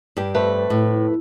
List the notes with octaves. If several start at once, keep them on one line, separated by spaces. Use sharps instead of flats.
G2 G4
F2 A3 B4
A2